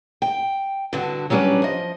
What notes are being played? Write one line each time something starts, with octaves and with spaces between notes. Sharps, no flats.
G5
G2 D3 F#4
F#3 G3 C#4 D4 B4
F3 D#5